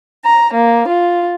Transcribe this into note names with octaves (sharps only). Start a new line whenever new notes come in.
A#5
A#3
F4